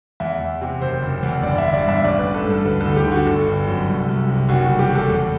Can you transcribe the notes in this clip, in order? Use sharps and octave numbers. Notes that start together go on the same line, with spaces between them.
E2 E5
E2
C3
F#1 C5
F#1
E2
G1 D5
E5
G1
D5
G2
E5
A1 D5
B4
A1
A4
G2 A4
D2 B4
D2 A4
G4
D3
F#4
G1 A4
G1
F#2
C2
C2
C3
F#1 F#4
F#4
G3
G4
E2 A4
E2